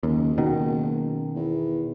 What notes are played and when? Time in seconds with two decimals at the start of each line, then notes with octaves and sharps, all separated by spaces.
0.03 F#1 D#2
0.38 B2 D#3
1.35 E2